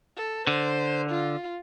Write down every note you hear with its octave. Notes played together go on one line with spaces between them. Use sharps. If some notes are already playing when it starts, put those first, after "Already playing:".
A4
D3 C5
F4